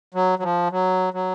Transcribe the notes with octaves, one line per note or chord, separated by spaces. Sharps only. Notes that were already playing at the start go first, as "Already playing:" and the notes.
F#3
F#3
F3
F#3
F#3